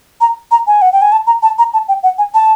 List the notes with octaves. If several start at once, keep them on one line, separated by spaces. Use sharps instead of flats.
A#5
A#5
G#5
F#5
G5
G#5
A5
A#5
A5
A#5
A5
G5
F#5
G#5
A5